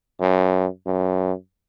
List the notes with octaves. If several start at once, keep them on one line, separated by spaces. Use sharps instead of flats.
F#2
F#2